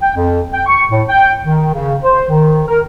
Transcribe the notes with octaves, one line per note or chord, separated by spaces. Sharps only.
G5
F2
G5
C#6
A2
G5
D#3
C#3
C5
D#3
A#4